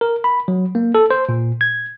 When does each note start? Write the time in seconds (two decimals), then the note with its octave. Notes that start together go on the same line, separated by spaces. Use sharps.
0.01 A#4
0.24 B5
0.48 F#3
0.75 A#3
0.95 A4
1.11 C5
1.29 A#2
1.61 G#6